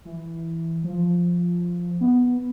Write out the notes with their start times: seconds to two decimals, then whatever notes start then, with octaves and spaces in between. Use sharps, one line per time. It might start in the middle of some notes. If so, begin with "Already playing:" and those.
0.05 E3
0.84 F3
2.01 B3